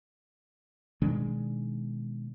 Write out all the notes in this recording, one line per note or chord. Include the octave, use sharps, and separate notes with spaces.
B2 D#3 G#3 D4